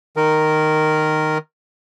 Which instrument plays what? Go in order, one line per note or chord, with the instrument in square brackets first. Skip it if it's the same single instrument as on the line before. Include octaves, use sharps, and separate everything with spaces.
[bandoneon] D#3 A#4